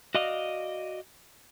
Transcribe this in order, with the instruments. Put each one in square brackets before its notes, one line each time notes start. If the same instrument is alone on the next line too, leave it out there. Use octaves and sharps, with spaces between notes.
[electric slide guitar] F#4 D5 D#5 F5